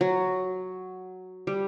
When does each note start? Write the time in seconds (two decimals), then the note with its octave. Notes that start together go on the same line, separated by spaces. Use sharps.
0.01 F#3
1.47 G3